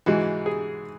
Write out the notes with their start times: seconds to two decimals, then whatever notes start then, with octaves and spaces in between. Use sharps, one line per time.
0.06 G#2 E3 G#3 F#4
0.46 G#4